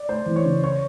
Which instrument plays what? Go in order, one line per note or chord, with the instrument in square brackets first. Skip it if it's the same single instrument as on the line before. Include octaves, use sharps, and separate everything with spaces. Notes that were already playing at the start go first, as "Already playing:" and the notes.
Already playing: [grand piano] D5
[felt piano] A3 [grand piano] C5
[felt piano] E3
[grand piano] C#5
[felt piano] C#3
[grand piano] C#5